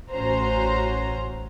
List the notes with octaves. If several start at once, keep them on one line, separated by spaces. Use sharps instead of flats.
A1 C#4 F#4 C5 A#5